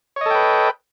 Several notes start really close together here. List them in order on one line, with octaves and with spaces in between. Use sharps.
C#5 D#5 A4 G5 B4